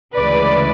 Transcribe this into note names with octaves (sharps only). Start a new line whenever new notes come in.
D2 C#3 E3 G#3 B4 D5